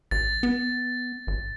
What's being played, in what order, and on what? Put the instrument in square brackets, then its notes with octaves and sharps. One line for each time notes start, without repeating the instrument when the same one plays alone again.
[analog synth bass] A1 [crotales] A6
[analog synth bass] B3
G#1